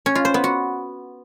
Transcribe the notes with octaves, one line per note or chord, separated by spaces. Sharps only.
C#4
F4
C5
B3
F#4